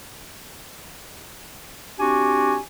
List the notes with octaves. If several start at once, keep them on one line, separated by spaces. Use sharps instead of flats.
C4 D4 F#4 G4 G#5